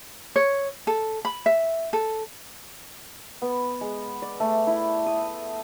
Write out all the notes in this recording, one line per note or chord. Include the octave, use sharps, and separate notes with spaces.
C#5
A4
B5
E5
A4
B3
G#3
D5
A3
E4
D#6